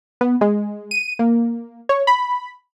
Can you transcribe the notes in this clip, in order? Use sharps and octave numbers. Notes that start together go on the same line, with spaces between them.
B3
G#3
D#7
A#3
C#5
B5